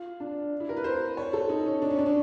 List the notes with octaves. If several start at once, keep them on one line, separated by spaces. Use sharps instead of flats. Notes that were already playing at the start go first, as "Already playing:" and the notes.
Already playing: F4
D4
E4
A#4
B4
C5
C#5
A4
D#4
C#4
D4
C#4
D4
C#4